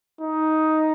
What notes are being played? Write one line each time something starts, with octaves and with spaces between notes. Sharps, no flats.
D#4